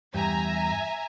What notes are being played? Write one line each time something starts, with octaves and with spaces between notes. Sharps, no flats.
E2 G2 G4 E5 G#5 A#5